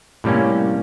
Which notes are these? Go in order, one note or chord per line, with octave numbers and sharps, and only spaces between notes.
A2 C3 G3 A#3 C#4